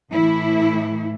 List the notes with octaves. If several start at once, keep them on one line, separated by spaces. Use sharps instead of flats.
A2 E3 E4